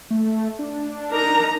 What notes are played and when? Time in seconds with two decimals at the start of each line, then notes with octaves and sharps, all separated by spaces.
0.10 A3
0.59 D4
1.11 D#4 A#4 A#5